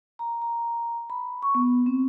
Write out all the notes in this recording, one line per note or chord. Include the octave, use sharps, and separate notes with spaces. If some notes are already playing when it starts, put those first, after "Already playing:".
A#5
A#5
B5
C#6
B3
C4